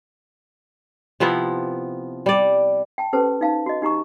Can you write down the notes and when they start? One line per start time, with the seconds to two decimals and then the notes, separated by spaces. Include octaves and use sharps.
1.20 C3 F3 B3 E4
2.26 G3 D5
2.98 G5 A5
3.13 C#4 G4 A4 B4 C5 A5
3.41 D#4 F5 A5
3.66 F#4 D#5
3.82 D#4 G4 A#5 C#6